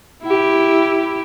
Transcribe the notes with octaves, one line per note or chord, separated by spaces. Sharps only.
E4 G4